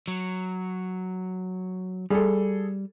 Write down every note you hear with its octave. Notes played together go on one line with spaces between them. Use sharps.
F#3
G3 G#4 A4